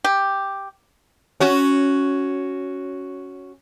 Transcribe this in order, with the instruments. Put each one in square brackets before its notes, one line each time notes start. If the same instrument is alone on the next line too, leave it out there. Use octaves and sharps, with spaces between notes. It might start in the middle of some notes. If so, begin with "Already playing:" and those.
[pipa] G4
[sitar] C#4 F#4